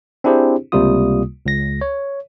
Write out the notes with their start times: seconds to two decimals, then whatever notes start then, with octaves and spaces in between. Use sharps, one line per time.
0.24 C4 D4 E4 G4 G#4 C5
0.72 C#2 C3 G3 A#3 F4 D#6
1.45 C#2 A#6
1.81 C#5